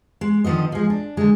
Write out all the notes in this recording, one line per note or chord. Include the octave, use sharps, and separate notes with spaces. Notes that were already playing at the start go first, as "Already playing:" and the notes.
G#3
D3 D#3 F3 B3 D#5
F3 G#3
D4
D3 G#3